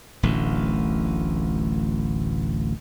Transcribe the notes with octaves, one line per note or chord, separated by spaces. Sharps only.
D1 A1 D2